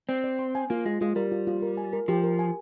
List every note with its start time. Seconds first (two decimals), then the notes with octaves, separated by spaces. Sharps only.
0.09 C4 D5
0.24 D5
0.39 C6
0.55 G#5
0.70 A#3 F4
0.86 G#3 F4
1.01 G#3 F4
1.16 G3 A#4
1.32 F4
1.47 F4
1.62 A#4
1.77 G#5
1.93 A#4
2.08 F3 G4
2.24 A#4
2.39 G#5